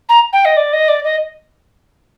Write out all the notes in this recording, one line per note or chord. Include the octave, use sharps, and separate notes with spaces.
A#5
G5
D#5
D5
D#5
D5
D#5